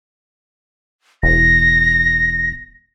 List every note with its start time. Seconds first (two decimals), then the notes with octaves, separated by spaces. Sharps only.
1.23 E1 A#6